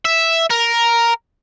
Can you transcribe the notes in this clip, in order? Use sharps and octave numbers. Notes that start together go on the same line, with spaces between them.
E5
A#4